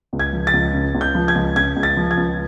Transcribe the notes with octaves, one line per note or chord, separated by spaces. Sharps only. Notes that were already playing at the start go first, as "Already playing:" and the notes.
C#2
G#6
F3
A6
C#2
C#3
C#2
G6
F3
G#6
C#2
C#3 G#6
C#2
A6
F3
G#6
C#2